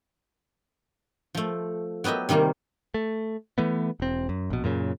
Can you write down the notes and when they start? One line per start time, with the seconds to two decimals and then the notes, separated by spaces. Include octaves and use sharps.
1.35 F3 A3
2.04 F#3 B3 G4 D#5 E5
2.29 C3 D#3 G3 A#3 F4
2.94 A3
3.58 E3 A3 B3
4.00 E1 C4
4.29 F#2
4.50 A#1 B2
4.64 F#2 A#2 C#3